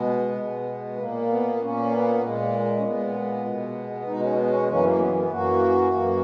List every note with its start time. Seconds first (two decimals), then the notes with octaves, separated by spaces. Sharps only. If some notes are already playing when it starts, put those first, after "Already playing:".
Already playing: B2 G#3 B3
0.36 B2 G#3
0.98 A#2 A#3
1.28 B3
1.60 A#2 A#3 C#4
1.90 B3
2.22 A#2 G#3
2.78 C#4
2.83 A#2 G#3 B3
3.44 B2 G#3
4.06 B2 G#3 D#4
4.20 C#4
4.35 B3
4.48 C#4
4.63 B3
4.68 F#2 E3 A#3 C#4
4.83 A#3
4.99 B3
5.14 B3
5.30 F#2 E3 A#3 F#4
5.92 F#2 E3 A#3